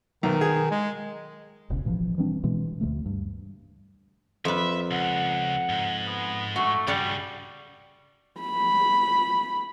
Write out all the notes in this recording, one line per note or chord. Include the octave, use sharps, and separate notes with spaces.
B1 D#3
G#4
G#3
E1 B1 C#3
A1 B2 E3 F3
E3 G3 C4 D4
B2 E3 G#3
D2 F#3 A3
G2
F2 B4 E5
C#2 F#5
G#2
B3
A3 F#4
G2 C#3 G3 G4 D5 F#5
B5